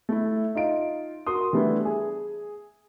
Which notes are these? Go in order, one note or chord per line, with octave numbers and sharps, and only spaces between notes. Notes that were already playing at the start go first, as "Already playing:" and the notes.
A3 E4
D#4 F4 D7
F#4 A#4 C6 D#6
E3 G3 A3 B3 D4 E4
G#4